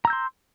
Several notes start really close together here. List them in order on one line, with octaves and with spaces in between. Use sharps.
A#5 E6 G6 C6